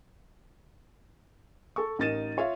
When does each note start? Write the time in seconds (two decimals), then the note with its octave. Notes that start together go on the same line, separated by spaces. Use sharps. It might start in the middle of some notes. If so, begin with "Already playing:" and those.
1.76 A4 C#6
1.99 A1 D#4 A#4 A6 D#7 E7
2.37 F4 C#5 E5 F5